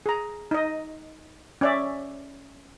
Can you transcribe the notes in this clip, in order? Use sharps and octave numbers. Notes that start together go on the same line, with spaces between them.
G#4 A#5
D#4 D#5
C#4 D5 E5